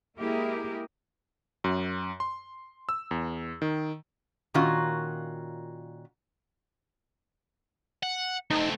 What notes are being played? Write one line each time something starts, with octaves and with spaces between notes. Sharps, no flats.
G#3 A#3 E4 G4 G#4 A#4
F#2
C6
E6
E2
D#3
A#2 D#3 C#4 F4 F#4
F#5
A3 C4 D#4